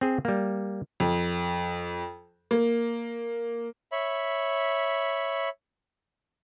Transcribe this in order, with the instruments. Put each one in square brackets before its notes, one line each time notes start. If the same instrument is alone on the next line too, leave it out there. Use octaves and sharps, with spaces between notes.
[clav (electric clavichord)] C4 G#4
G3 A#3
[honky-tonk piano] F2
A#3
[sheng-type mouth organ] C#5 E5 B5